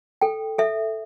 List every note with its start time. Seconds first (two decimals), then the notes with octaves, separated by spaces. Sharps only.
0.21 A4 G5
0.58 A4 E5